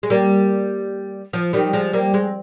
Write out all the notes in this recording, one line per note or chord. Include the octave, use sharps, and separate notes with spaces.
G#3
G3 A#3
F3
D#3 G3
F3 G#3
G3 A#3
G#3 C4